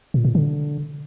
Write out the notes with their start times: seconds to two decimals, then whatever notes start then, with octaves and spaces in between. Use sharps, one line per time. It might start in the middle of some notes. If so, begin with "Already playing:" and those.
0.14 A#2
0.25 A#2
0.35 D3